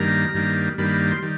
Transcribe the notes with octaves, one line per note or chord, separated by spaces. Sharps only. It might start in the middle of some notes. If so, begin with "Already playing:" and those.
Already playing: G2 D#3 G3 A#3 A#5
G2 D#3 G3 A#3
G2 D#3 G3 A#3 B5
B5
C6
D#3 G3